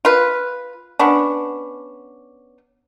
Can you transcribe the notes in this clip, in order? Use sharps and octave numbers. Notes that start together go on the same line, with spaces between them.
F4 B4
B3 C#4 D4